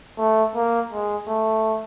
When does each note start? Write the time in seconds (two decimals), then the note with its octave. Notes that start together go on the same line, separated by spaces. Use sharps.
0.18 A3
0.56 A#3
0.92 G#3
1.28 A3